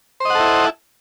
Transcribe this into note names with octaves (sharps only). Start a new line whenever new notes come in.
E4 A4 C5 D#5 F#5